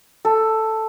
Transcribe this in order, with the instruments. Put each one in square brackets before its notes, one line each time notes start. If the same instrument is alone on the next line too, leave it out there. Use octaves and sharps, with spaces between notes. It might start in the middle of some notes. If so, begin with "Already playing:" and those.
[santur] A4